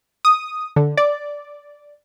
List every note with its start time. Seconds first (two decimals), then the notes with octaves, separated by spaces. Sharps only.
0.25 D#6
0.76 D3
0.97 D5